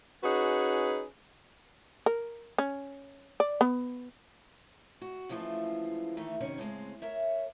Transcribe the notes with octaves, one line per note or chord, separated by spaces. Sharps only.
C#4 D#4 F#4 G#4 B4
A#4
C#4
D5
B3
F#4
C#3 E3 F3 G#3 A3 F4
D#3 E3 A3
F#2 C3 D#3 C#4 C#5
A2 C#3 G#3 C4
A#4 C#5 E5